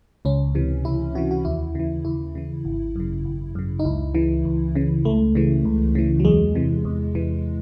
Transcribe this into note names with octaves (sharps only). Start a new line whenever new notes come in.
C#2 C#4
C3 E3
C#2 E4
C3 E3 F#4
F#4
D#2 E4
C#3 E3
D#2 E4
C#3 E3
G#1
F#2 C#3
G#1
F#2 C#3
D#4
C#2 E4
C#3 E3
C#2
C#3 E3
C#2 A3
C#3 E3
C#2
C#3 E3
F#3
E2 G#3
C3 E3
E2
C3 E3